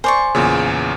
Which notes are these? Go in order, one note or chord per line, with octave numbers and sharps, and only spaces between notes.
C5 D5 G#5 C#6
E2 A#2 C#3